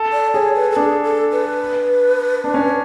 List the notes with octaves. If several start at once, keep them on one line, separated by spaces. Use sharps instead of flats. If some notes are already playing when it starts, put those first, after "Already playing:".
Already playing: A4
D5
G#4 C#5
B4
A4
D4 G#4
A4
B4
D4
C#4